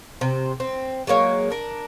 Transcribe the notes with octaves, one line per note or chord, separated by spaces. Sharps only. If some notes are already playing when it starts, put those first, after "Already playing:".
C3 C5
C4
F#3 G#3 A#3 C#5
D4 A#4